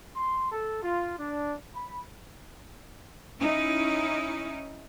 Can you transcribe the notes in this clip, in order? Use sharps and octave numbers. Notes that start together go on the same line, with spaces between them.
C6
A4
F4
D4
B5
C#4 D#4 E4